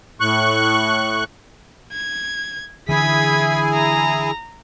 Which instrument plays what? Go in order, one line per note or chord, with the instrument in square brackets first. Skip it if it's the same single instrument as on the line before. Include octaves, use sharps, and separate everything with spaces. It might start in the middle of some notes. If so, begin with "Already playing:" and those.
[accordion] A2 C#6 F#6
[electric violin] G#6
[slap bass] D3 E3 [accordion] E4 G#4 G#5 [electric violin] G#6 B6
[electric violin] A#5